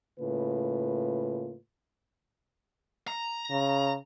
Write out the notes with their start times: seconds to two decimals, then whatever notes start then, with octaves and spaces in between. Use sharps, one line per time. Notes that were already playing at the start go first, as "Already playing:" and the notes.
0.20 A2 C#3 A#3 F4 B4
3.08 A#5
3.50 C#3